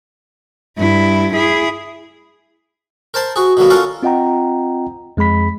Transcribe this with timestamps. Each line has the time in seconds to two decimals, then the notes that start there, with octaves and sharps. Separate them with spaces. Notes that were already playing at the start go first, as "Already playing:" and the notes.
0.78 G2 E4
1.33 E4 G#4
3.14 A#4 C5 A5 B5
3.36 F#4 G#4
3.57 B2 D3 F#3 A#3 B3
3.70 C#4 F4 A4 A#4 F#5
4.03 C4 F4 D#5 F#5 G5 A#5
5.17 F2 G#3 G#4 B5 B6